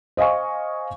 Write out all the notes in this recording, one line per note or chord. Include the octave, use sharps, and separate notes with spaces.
C5 D#5 F5 G#5 C#6